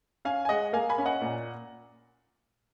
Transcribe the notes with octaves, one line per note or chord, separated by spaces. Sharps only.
C#4 F5 G#5
G#5
G#3 D#5 F#5
A#3 F5 G#5
G#5 B5
C#4
D#5 F#5
A#2